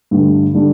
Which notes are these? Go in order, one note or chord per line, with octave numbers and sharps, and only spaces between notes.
G2 D3 A3
D3 G3 D4 A4